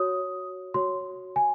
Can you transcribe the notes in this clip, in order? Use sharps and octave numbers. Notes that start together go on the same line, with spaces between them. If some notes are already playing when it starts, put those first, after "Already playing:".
Already playing: F#4 C#5 D#6
F#4 C#5 C6
G#5